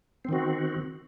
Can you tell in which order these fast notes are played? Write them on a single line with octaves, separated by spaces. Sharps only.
C4 D#3 F#4